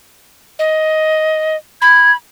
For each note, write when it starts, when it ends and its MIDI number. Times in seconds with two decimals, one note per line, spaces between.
0.59 1.56 75
1.82 2.16 83
1.82 2.11 92